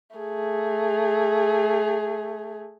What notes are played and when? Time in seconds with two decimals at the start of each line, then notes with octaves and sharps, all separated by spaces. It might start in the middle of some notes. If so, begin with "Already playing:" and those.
0.17 A3 G#4